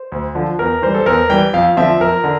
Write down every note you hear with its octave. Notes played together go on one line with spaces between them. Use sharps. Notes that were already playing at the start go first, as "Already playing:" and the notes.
Already playing: C5
D2
D3 F3
E2 A#4
E3 G3 C5
A4
E2 A#4
E3 G3 G5
F2 F5
D3 F3 C4 E5
F2 A#4
D3